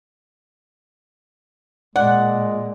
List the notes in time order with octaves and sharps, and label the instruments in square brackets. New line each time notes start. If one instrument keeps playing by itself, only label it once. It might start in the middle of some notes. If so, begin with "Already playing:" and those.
[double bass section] A#2 [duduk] G#3 [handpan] D5 [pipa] F#5